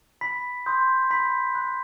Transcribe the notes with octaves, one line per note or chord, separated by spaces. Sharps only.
B5 B6
C6 D#6 G6
B5 B6
B5 F#6